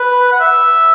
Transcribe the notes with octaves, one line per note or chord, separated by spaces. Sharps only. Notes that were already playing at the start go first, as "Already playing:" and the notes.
Already playing: B4
F#5
E5